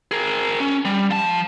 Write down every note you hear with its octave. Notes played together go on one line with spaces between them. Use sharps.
G#4 A#4
C#4
G3
F3 A5